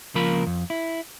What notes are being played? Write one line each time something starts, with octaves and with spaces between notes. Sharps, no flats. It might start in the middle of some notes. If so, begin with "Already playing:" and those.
C#2 C#3 F3 A#3 A#4 B5
F2
E4